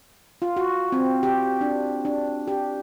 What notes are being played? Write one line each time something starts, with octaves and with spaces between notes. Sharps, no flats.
F4
F#4
C4
G4
D4
D4
G4